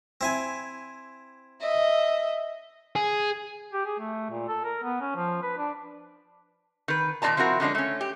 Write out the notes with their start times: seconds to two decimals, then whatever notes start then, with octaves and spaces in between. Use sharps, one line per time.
0.21 C4 E4 G#5
1.62 D#5 E5
2.96 G#4
3.73 G4
3.86 G#4
3.99 A3
4.30 A#2
4.48 A4
4.64 A#4
4.84 B3
5.01 C#4
5.15 F3
5.43 B4
5.58 D4
6.88 D#3 B4
7.22 A#2 D#3 F4 D5 A5 A#5
7.37 F3 C4 E4 F#4 A#4
7.60 D3 F3 G#3 C#4 D4
7.75 A3 C#4
8.01 G4